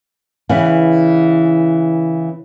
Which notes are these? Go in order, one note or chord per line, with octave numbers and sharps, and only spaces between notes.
C#3 E3 B3